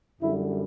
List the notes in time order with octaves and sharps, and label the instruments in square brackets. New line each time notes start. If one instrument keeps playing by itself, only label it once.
[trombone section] F#2 D3 G3 E4